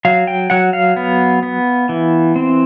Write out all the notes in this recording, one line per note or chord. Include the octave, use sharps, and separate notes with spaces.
F#3 F5
G5
F#3 F#5
F5
B3
B3
E3
C4